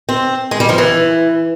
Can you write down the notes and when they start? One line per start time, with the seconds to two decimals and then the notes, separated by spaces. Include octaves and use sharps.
0.09 C4
0.51 G#3
0.60 G3
0.69 F3
0.78 E3